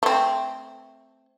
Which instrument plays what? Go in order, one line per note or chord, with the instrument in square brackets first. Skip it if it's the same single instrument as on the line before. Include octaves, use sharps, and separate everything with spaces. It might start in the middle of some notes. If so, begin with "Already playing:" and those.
[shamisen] A3 C4